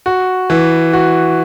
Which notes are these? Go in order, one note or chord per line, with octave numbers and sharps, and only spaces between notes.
F#4
E3
F#4